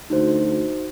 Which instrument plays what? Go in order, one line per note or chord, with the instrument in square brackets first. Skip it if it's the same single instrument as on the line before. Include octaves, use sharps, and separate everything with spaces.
[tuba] D2 [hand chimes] D#4 F#4 C5